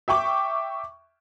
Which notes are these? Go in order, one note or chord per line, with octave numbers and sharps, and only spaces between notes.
E5 G5 C#6 D6